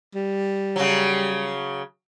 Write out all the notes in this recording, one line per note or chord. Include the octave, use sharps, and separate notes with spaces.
G3
C#3 F#3